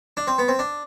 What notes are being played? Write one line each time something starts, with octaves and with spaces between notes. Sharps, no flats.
D4
C4
B3
C4
D4